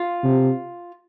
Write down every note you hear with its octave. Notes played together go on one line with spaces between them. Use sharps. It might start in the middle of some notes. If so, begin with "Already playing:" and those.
Already playing: F4
C3